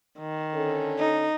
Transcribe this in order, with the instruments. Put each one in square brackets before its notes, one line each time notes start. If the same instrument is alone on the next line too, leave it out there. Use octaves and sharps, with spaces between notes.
[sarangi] D#3
[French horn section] D3 C#4 A4
[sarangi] D#4